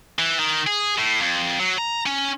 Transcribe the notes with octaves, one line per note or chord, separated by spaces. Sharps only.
E3
D#3
G#4
A2
F2
F#3
A#5
C#4